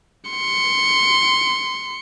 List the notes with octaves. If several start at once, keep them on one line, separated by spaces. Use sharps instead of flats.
C6 C#7